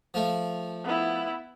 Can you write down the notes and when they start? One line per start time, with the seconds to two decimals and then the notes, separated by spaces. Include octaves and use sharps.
0.14 F3 A3
0.84 B3 E4